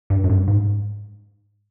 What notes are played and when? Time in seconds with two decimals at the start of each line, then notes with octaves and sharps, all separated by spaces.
0.10 G2
0.24 F#2
0.30 G2
0.48 G#2